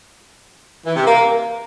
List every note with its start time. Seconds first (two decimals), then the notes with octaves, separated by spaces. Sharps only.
0.86 E3
0.96 C3
1.06 A#3